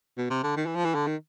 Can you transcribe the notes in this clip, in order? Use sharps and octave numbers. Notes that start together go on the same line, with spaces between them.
B2
C3
D3
D#3
E3
F3
E3
D3
D#3